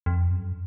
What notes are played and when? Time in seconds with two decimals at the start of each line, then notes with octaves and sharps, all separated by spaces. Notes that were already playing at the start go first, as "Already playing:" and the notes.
0.06 F2
0.31 F#2